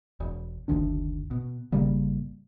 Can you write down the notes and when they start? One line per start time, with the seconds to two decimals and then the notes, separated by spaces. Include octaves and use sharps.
0.20 E1
0.68 F#1 D2 D#3 D4
1.31 B2
1.72 G#1 C#3 G3 A#3